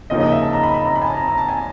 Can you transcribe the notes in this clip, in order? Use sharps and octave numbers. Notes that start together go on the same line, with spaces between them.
D#2 C#3 F3 A#3 D#4 D#5
D#5
E5
A5
A#5
B5
B5
A#5
B5
G#5
A5
A#5
A#5
A5
G#5